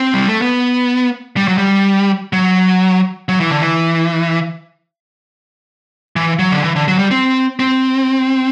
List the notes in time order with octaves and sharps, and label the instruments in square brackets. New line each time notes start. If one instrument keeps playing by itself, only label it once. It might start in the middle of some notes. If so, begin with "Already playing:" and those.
Already playing: [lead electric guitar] C4
G3
A3
B3
G3
F#3
G3
F#3
F#3
E3
D3
E3
E3
F#3
D3
E3
D3
F#3
G3
C4
C4